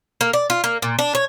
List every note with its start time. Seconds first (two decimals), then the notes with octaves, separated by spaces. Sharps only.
0.21 A#3
0.33 D5
0.50 F4
0.64 A#3
0.82 A#2
0.99 D4
1.15 C#5